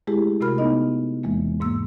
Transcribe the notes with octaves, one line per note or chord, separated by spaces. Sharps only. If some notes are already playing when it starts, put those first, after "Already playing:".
G#3 A3 E4 G4 G#4
C3 A3 F#4 A#4 B5 F6
B3 D#4 D#5
E2 E3 G#3 A#3
G#2 A#3 E6